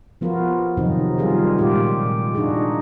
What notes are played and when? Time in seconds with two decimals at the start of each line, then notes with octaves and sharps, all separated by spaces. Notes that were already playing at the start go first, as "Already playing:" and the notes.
0.21 F3 B3 F4 F#4 A#4
0.77 C3 D#3 F3 F#3 C4 D#4
1.18 D#3 G3 F4 G#4 A#4
1.58 A#2 G#3 F4 G4
2.34 D4 D#4 F4 F#4 G#4